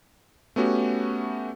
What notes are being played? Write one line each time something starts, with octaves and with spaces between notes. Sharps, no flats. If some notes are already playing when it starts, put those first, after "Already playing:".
A3 B3 C#4 F#4 G4